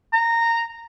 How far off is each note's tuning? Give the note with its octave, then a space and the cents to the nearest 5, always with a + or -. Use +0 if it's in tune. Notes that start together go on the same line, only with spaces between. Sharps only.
A#5 -15